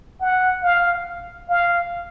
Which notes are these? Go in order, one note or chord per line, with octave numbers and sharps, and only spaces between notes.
F#5
F5
F5